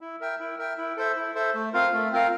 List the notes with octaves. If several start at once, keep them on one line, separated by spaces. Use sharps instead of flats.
E4
A#4 E5 G5
E4
A#4 E5 G5
E4
A4 C5 E5
E4
A4 C5 E5
A3
C4 F4 A#4 F5
A3
C4 F4 A#4 F5